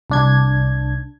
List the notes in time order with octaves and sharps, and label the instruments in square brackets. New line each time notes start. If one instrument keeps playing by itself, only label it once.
[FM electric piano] C2 D4 G#6